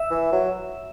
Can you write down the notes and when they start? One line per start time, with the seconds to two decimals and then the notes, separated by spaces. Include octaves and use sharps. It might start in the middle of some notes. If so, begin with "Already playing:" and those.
Already playing: E5
0.10 E3
0.32 F#3